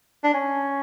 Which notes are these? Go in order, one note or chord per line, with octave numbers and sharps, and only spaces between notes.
D4
C#4